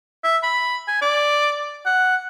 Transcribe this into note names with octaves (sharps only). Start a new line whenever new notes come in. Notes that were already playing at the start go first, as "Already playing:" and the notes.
E5
B5
G#5
D5
F#5